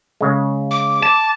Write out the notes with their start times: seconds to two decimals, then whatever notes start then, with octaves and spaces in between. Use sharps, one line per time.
0.21 C#3 G#3
0.71 D6
1.03 A5